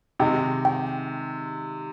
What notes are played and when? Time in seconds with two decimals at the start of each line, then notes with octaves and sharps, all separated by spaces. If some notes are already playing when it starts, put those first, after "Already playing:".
0.20 C3 D#3 G#3 D#4 G5
0.65 G5